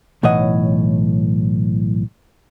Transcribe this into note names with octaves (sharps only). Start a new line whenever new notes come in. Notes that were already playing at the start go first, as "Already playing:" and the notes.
B1 A2 E3 C#5 D#5 F#5